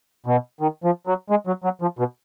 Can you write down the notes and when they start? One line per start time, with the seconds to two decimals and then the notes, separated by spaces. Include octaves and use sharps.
0.26 B2
0.61 D#3
0.84 F3
1.07 F#3
1.30 G#3
1.47 F#3
1.64 F#3
1.82 F3
1.99 B2